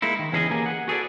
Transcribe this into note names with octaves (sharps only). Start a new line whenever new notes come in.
G#3 A#3 D#4 E4
D#3
E2 E3 C#4 G#4 A4 D#5
A#3 G4 G#4 G#5
G#4 F#5
F#4 G#4 A4 B4 D5